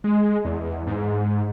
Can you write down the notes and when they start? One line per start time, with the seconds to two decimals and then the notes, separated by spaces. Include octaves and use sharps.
0.04 G#3
0.45 E2
0.87 G#2